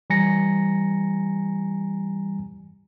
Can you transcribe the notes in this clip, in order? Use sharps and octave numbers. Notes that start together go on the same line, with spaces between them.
E3 G3 G#5 A#5 A#6 C#7